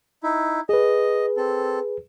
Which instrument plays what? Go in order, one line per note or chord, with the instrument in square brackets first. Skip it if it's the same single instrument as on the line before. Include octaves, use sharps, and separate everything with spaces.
[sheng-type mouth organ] D#4 E4
[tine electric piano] G#4 B4 [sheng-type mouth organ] D#5
[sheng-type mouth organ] C4 A4